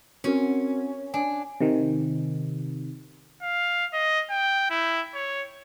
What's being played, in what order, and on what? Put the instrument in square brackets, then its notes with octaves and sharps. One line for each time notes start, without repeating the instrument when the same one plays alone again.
[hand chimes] C4 F#4 A#4 [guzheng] C#4
[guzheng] D4 [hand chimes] G#5
[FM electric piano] C3 D#3
[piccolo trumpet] F5
D#5
G5
E4
C#5